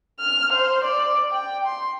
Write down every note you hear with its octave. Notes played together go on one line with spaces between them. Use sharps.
F6
C5
D5
G5
C6